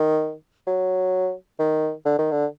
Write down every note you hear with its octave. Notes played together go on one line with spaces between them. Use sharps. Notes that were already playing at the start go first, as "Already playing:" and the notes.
Already playing: D#3
F#3
D#3
D3
D#3
D3